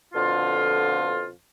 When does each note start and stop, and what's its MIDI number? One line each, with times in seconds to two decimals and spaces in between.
0.13 1.28 41
0.13 1.28 47
0.13 1.28 50
0.13 1.28 65